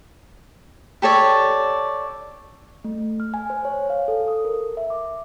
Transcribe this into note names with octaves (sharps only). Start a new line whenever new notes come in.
G4 A4 C#5 D5
A3
F6
G#5
C5
C#5
F5
A4
D#6
A#4
E5
D6